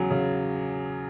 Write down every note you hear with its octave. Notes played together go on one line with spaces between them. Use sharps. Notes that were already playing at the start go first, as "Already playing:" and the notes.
Already playing: E2 C#3 F#3
C#3